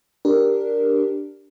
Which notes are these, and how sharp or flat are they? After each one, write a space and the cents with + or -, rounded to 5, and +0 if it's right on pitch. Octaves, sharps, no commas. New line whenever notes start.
D4 +0 G4 +0 A#4 +0